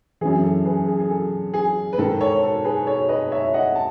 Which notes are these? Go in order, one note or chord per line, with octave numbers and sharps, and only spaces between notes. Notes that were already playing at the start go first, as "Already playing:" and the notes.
F#2 E3 G#4
A4
G#4 B4
G#4
G#4
A4
G#4
B4
G#2 D#3 A4
A4 C#5
A4
G#4 B4
A4 C#5
B4 D#5
C#5 E5
D#5 F#5
A5